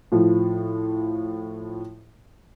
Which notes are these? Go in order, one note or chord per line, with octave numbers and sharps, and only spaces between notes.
A2 F3